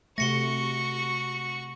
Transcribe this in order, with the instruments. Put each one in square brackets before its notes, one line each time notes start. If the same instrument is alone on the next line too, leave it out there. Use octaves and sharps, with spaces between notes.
[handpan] C3 A3 [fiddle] F#4 C#6 [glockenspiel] A#6 C#7 G7